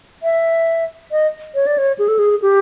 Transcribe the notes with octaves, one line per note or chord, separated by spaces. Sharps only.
E5
D#5
C#5
D5
C#5
G#4
A4
G#4
G4